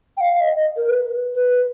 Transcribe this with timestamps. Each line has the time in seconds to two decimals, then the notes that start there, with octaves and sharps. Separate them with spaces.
0.17 G5
0.21 F5
0.41 D#5
0.77 A#4
0.88 B4
1.35 B4